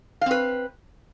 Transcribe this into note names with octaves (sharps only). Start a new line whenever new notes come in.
C4 B4 F5